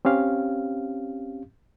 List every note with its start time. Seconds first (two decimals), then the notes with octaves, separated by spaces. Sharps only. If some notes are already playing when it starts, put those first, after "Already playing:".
0.05 C4 C#4 G4 F5